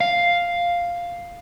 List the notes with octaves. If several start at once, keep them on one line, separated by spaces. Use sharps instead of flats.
F5